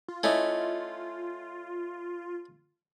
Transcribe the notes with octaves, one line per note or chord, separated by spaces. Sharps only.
F4
A3 C#4 E4 D#5